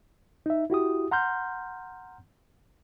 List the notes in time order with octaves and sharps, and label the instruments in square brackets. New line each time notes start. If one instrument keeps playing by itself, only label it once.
[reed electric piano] D#4 E5
E4 F#4 G4 D#6
F#5 A#5 C6 F6 G6